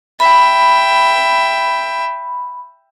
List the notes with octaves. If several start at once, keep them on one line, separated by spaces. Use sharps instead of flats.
E5 G5 B5